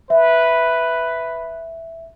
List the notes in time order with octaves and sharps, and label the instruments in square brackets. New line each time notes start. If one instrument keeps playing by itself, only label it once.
[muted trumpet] B4 [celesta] E5